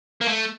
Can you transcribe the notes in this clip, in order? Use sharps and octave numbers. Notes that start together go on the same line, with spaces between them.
A#3
A3